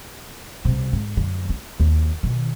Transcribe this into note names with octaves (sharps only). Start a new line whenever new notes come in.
C2 C3
G#2
F#2 D3
D4
D#2
B2 D#3